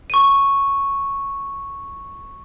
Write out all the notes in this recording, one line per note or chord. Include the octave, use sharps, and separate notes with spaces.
C#6 D#7